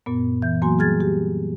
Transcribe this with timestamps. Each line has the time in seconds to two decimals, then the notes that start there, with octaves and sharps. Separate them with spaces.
0.06 F#2 A#2 B3
0.42 E3 G6
0.62 E3 F#3 A#3 F#4 G#5 C6
0.78 G3 G#4 F6 G#6 A6
1.00 G4